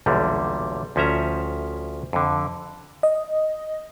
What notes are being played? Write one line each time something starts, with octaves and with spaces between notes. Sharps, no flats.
B1 E2 A#2 D3 G3
D2 F3 C#4 E5 A#5
F2 D3
D#5